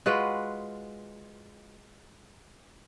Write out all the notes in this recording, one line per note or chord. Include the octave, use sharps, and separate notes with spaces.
G#3 F4 F#4 B4